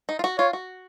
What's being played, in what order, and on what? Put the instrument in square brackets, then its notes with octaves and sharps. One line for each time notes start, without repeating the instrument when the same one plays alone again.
[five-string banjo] D#4
F4
F#4
[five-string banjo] F4 [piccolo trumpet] C#5
[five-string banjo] F#4